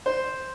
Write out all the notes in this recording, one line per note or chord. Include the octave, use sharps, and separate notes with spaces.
C5